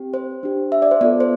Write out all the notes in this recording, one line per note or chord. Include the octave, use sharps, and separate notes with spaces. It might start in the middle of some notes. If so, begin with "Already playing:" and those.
Already playing: C4 G4
C5
D4 G4
E5
D5
C5
B3 F4 A4 D5
C5